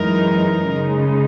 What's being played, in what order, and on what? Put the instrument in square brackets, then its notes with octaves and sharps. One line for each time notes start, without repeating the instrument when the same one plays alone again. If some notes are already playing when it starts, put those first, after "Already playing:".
Already playing: [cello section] F#2 E3 G#3 D#4 [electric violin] A#4
[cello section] C#3 G#3 D#4